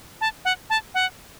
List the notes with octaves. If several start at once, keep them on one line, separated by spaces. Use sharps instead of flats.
A5
F#5
A5
F#5